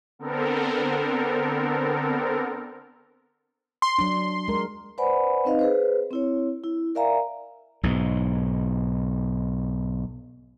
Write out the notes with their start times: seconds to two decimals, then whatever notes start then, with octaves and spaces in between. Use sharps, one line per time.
0.19 D3 B3 C4 A4 A#4
3.82 C6
3.99 F#3 D4
4.48 G#3 A#4
4.98 B4 C5 D5 F#5 G#5 B5
5.45 C4 D#4 B4 D#5 F5
5.59 G#4 B4 C5
6.11 C4 E4 C#5
6.64 E4
6.95 A#4 D5 E5 F5 G#5 A#5
7.83 B1 G#2